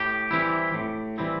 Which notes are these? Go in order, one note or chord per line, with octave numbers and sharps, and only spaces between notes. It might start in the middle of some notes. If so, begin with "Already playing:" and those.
Already playing: A2 G4
E3 G3 C4 E4
A2
E3 G3 C4 E4